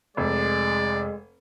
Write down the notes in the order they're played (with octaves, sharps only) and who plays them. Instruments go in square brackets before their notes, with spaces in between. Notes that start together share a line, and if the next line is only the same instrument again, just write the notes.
[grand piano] F1 [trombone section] G#3 [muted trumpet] D5